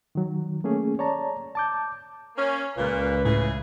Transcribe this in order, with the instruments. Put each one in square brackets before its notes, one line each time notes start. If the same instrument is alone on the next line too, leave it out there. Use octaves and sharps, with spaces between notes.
[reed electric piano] D#3 F#3
A3 A#3 C#4 G#4
C#5 D5 A5 A#5
A5 D6 G6
[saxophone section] A#3 C#4
[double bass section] C#2 [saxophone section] A#2 [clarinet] B4
[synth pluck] A2 [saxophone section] C#3 E3 G#4